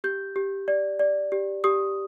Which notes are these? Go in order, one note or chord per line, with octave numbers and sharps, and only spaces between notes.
G4 G6
G4
D5
D5
G4
G4 D#6